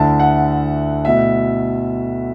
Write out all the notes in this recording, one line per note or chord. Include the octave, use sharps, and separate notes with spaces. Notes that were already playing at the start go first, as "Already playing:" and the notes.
Already playing: D2 D3 A3 E4 A5
F#5
B2 A3 E4 E5